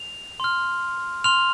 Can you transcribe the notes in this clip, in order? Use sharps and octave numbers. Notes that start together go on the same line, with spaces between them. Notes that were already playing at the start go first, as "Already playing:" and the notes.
Already playing: F7
C6 F6
C6 F6 F7